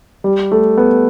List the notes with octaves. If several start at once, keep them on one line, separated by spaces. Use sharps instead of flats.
G3
A3
B3